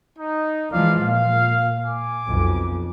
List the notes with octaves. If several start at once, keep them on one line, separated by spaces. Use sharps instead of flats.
D#4
E3 F3 G#3 D5 F5
A#2 F5
G#5 D6
B1 F2